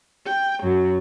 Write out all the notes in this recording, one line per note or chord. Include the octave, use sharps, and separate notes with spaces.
G5
F#2 F#3